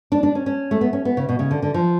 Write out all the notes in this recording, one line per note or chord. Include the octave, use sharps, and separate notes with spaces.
D4
D4
C#4
C#4
A3
B3
C#4
B3
C#3
B2
C#3
D3
D3
F3